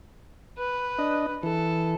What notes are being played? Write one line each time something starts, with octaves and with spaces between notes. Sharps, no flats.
B4
D4 D#5
E3 A4